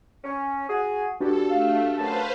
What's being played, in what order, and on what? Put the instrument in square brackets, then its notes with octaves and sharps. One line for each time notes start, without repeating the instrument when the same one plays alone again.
[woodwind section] C#4
F#4 G#4
[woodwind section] G2 [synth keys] D4 F#4 G4 [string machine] A4
[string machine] A3 [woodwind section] F5
[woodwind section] F#2 A5 [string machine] B4 C5 F5